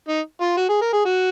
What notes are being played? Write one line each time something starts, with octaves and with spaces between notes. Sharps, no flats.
D#4
F4
F#4
G#4
A#4
G#4
F#4